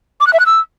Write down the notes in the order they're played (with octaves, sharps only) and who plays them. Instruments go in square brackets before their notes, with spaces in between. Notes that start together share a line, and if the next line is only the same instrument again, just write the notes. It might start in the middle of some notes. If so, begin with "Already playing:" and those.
[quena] D6
F#6
E5
F#6
E6